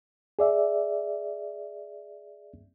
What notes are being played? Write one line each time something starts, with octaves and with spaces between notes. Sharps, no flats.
G#4 D5 E5